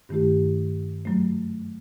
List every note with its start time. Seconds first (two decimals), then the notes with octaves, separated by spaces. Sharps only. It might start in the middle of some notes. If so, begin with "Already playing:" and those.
0.09 G2 D#3 A3 E4 G4
1.05 F#2 F#3 A3